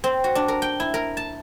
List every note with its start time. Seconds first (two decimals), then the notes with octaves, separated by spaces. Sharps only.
0.04 C4
0.24 F#4
0.35 D4
0.48 A#4
0.62 G5
0.80 E4
0.94 A#4
1.17 A5